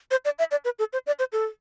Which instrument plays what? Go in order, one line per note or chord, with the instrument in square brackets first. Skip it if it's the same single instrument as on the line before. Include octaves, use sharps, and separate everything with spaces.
[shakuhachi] C5
D5
E5
D5
B4
A4
C5
D5
C5
A4